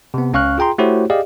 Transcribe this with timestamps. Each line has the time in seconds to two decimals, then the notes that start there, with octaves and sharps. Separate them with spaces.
0.14 C3 B3
0.33 C#2 C#4 F5 C#6 F6 F#6
0.58 F4 G#4 G5 A#5 C6
0.78 A3 E4 F#4 G4 C5 C#5
1.10 G4 G#4 D5 D#5 F5